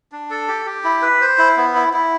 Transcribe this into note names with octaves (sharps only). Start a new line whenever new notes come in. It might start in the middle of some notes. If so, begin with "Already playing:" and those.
D4
A4
G4
G4
E4
B4
C5
E4
B3
E4
E4